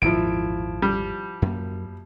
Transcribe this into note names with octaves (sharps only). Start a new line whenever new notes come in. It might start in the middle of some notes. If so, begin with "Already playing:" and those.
G#1 E2 A#2 F3 E4 D7
G3
F#2 A#3